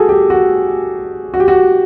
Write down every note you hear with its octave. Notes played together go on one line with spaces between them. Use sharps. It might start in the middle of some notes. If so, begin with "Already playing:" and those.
Already playing: F#4 G#4 A4
G4
F#4
F#4
G4
F#4